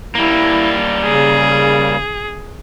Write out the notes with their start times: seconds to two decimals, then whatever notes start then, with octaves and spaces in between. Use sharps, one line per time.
0.15 G3 A#3 E4
1.04 C#3 G#4